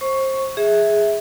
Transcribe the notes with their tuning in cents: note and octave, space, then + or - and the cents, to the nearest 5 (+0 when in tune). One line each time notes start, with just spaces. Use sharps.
C5 +25 C#6 +5
G#4 +0 E5 -15